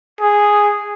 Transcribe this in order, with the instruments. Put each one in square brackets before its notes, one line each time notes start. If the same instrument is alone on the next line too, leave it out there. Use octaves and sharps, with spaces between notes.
[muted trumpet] G#4